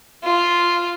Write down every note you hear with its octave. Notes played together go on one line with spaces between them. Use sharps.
F4